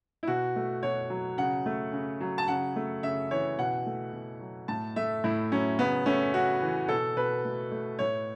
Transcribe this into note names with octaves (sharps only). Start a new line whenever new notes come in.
E4
B2 F#4
A3
B2 C#5
F#3
C#3 F#5
A3
C#3
F#3
A5
C#3 F#5
A3
C#3 E5
E3 C#5
B2 F#5
A3
B2
F#3
A2 A5
A3 E5
A2 E4
F#3 C#4
C#3 B3
A3 C#4
C#3 F#4
E3
B2 A4
B2 B4
A3
A3
A2 C#5